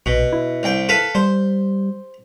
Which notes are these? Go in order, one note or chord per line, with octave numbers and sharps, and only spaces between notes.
A#1 B2
E4
C2 G5
A4 B4 F5
G3 C5